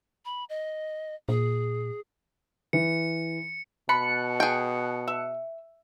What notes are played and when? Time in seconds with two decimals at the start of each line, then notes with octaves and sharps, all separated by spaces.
0.25 B5
0.49 D#5
1.29 A#2 G#4
2.73 E3 C#7
3.89 B2 A5 B5 F#6 C#7
4.40 G#4 G5
5.08 E5